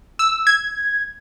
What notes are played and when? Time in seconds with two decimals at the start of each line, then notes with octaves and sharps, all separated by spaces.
0.19 E6
0.47 G#6